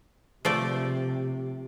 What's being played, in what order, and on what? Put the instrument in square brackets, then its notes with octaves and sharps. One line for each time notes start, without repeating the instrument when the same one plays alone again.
[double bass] C3 [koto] F3 A3 D5